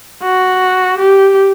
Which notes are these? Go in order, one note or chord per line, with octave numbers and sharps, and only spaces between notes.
F#4
G4